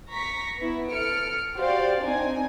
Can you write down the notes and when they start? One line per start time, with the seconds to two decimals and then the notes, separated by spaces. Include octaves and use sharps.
0.11 A#5 C#6 B6
0.57 B3 E4
0.90 A4 F6 C#7 D7
1.55 F#4 G4 C5 D5 F5
2.01 C4 D4 D#4 G#5